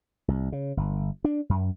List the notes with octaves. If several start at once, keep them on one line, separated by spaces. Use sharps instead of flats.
C2
C#3
G1
D4
F#2